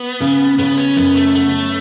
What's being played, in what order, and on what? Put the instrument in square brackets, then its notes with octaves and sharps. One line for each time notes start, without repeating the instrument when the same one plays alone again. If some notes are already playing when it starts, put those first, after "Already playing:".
Already playing: [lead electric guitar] B3
[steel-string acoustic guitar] C#3
[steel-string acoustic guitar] C#3 [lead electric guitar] B3
[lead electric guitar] C#4
[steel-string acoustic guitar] F#2 [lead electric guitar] B3
[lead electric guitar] A3
[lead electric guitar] A3 [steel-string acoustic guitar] B3